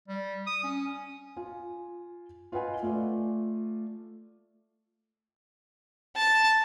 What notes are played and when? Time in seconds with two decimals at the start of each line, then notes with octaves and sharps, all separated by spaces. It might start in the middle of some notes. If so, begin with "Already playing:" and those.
0.08 G3
0.47 D#6
0.64 C#4
1.36 F4 G#5
2.52 F4 B4 D#5 F#5 G#5
2.82 A3 F4 D5
6.17 A5